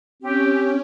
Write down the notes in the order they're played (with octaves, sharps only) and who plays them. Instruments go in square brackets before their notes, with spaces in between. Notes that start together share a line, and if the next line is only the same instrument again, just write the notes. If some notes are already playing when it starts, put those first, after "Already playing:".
[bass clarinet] C4 [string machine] C#4 [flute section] G4